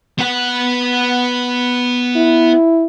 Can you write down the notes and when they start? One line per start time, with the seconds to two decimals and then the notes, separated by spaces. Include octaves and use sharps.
0.19 B3 F#5
2.16 E4